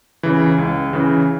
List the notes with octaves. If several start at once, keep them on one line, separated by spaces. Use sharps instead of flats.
C#3 E3
C#2
C#3 E3